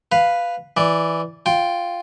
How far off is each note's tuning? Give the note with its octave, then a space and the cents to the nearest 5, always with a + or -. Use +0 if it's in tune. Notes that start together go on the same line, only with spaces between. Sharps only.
B4 +0 F5 +0
E3 +0 D5 +0
F4 +0 G5 +0